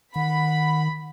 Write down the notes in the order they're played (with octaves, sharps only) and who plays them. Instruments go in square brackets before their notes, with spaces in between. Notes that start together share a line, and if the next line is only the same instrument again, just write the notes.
[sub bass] D#3 [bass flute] F#5 [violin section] B5